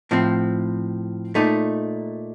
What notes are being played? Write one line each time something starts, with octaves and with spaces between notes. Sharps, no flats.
A2 F3 C4
A#2 A3 D#4